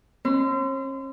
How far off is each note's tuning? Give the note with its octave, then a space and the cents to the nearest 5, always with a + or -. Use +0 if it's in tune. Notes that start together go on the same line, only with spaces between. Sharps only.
C#4 -45 C6 -30